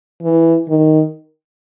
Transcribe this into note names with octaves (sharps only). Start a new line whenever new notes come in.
E3
D#3